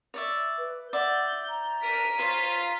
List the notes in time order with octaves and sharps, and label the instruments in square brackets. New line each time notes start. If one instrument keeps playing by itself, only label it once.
[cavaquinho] C#5 D5 E5
[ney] B4
[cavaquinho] D5 E5 [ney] F#5 [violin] G6
[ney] A#5
[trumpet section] D4 A#4 [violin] B6 D#7
[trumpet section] F4 [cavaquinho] C5 C#5